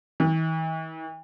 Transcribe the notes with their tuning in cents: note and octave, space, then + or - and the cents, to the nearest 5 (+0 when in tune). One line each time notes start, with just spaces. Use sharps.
E3 -45